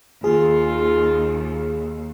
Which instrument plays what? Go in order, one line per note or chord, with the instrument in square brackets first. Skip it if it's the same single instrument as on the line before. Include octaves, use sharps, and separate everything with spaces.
[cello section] D#2 [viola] F4 [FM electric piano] G#4